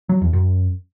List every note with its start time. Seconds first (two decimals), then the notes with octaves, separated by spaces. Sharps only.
0.09 F#3
0.21 E2
0.33 F#2